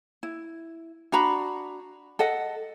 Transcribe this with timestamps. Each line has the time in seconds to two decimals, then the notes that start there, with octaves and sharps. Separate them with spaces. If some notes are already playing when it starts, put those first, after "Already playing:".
0.23 E4
1.12 D4 F#4 A#5 B5
2.19 A4 D#5 F#5